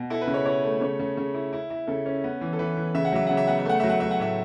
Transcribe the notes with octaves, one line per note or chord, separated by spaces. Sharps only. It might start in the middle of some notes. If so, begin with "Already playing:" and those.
Already playing: B2
E4 A4
B4
C#3
C#5
E4 C#5
A3
C#3 C#5
C#3
C#3
E4
E4
E4
C#3 A4
C#4
B3
E3
A4
E3 B4
E3
C#3 E5
F#5
F#3 E5
C#3 F#5
E5
B3 F#5
E5
A3 F#5
F#3 E5
F#5
F#3 E5
F#5
A2 E5